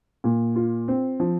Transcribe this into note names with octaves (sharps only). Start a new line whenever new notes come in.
A#2
F4
C4
F3